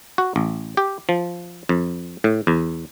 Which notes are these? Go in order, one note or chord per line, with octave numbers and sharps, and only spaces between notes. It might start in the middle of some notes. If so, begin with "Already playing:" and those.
F#4
A1
G4
F3
F2
A2
E2